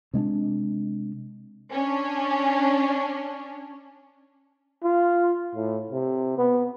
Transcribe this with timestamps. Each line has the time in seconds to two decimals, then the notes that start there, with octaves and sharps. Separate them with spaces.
0.14 C3 G#3 C#4 D4
1.72 C#4 D4
4.84 F4
5.55 A2
5.91 C3
6.38 B3